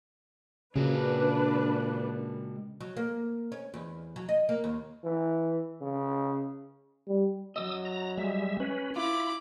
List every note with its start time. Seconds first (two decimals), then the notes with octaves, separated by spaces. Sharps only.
0.76 A#2 C#3 G#3 D4 F#4 B4
2.81 F#3
2.97 A#3
3.52 C#4
3.74 E2
4.16 F#3
4.29 D#5
4.49 A#3
4.64 D#2
5.04 E3
5.81 C#3
7.08 G3
7.56 F#2 E3 F#3 D#5 D#6 E6
7.85 A#5
8.18 G3 G#3 E5
8.60 C#4 B4
8.96 E4 F4 B5 D6